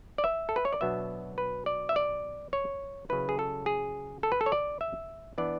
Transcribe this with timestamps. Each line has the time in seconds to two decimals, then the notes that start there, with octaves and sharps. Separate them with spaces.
0.18 D5
0.24 E5
0.49 A4
0.56 B4
0.65 C#5
0.73 D5
0.81 B2 F#3 B3 D4 E5
1.38 B4
1.66 D5
1.89 E5
1.96 D5
2.53 C#5
3.09 C#3 F#3 C#4 E4 B4
3.29 G#4
3.39 A4
3.66 G#4
4.23 A4
4.32 B4
4.41 A4
4.46 C#5
4.52 D5
4.81 E5
5.38 E3 B3 D4 D5